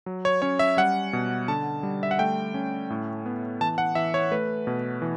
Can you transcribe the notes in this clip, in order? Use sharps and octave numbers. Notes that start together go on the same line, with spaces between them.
F#3
C#5
C#4 C#5
E5
G3 F#5
B2
D3 A5
G3
E5
F#5
A3 G5
C#4
A2
B3
E3 A5
F#5
E3 E5
C#5
A3 B4
B2
E3